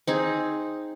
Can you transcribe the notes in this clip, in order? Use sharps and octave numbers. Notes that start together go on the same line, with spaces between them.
C4 D#4 G#4